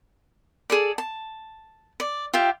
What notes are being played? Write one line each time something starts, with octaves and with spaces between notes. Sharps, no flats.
G#4 A4 D5
A5
D5
F4 G4 E5 G5